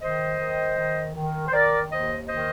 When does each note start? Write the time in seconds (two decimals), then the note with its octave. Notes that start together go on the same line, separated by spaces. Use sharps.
0.02 D#3 C5 D#5
0.40 D#3
0.78 D#3
1.15 D#3
1.48 C5
1.53 D#3 A#4 D5
1.90 D#2 C5 D#5
2.28 D#3 C5 D#5